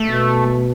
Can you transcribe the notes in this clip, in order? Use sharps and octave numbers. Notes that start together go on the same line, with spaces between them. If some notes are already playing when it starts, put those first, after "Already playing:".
Already playing: A3
B2